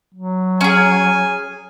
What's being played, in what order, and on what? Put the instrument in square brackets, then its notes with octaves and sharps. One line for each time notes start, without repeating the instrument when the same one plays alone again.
[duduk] F#3
[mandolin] C#4 G#4 [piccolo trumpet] G#5